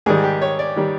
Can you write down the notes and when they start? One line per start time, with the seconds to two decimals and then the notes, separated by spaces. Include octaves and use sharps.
0.06 G#2 D#3 G3 G#4
0.24 G4
0.42 C#5
0.59 D5
0.76 D#3 G3